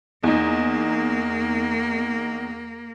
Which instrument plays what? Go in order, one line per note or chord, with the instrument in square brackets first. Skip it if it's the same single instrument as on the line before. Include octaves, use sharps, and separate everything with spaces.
[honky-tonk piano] E2 D#4 [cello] A#3